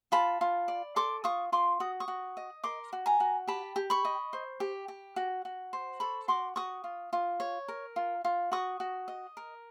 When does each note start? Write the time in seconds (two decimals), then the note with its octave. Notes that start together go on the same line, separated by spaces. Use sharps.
0.12 F4 A5 B5
0.41 F4
0.68 D5
0.96 A4 C6 D6
1.24 F4 C#6 D#6
1.52 F4 C6 D6
1.80 F#4 D#6
2.00 C#6 D#6
2.08 F#4
2.37 D#5
2.64 A#4 C6 D6
2.93 F#4
3.06 G#5 A#5
3.20 F#4
3.48 G4 A5 B5
3.76 G4
3.90 B5 C#6
4.05 D#5
4.33 C5
4.60 G4
4.88 G4
5.16 F#4
5.45 F#4
5.73 C5
6.00 A4 B5 C#6
6.28 F#4 C6 D6
6.56 F#4 C#6 D#6
6.84 F4
7.13 F4
7.40 C#5
7.68 A#4
7.96 F4
8.24 F4
8.52 F#4 C#6 D#6
8.80 F#4
9.08 D#5
9.37 A#4